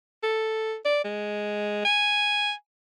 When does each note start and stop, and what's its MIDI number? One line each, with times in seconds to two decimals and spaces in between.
0.23 0.76 69
0.85 1.02 74
1.04 1.81 56
1.85 2.52 80